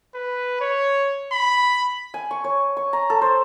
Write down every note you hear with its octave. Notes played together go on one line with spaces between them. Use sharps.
B4
C#5
B5
G#5
C#6
C#5
C#6
A#5
A4
C5